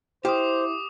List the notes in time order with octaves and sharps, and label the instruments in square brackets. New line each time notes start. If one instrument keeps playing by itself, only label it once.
[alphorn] E4 [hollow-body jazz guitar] G4 F5 [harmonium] C5 [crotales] D6 D#6